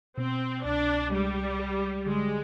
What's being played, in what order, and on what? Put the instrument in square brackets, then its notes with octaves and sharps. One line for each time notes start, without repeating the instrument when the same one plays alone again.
[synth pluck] B2 [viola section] C4
[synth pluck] C2 [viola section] D4
[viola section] G3 [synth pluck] G#3
[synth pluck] G4
[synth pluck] D3 [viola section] G#3